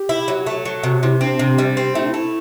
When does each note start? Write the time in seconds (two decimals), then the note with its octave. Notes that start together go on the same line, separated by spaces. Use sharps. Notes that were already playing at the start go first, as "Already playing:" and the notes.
Already playing: G4
0.09 E4
0.28 F#3
0.47 A3
0.65 F#3
0.83 C3 F#4
1.03 C3 E4
1.21 C4 D4
1.39 C3
1.58 G3
1.77 C4
1.95 A3 E4
2.03 D4
2.09 A3 E4